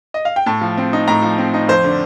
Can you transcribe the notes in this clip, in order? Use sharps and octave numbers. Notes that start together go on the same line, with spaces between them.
D#5
F5
G5
A2 A5
F3
C4
D#4
A2 A#5
F3
C4
D#4
F2 C5
D3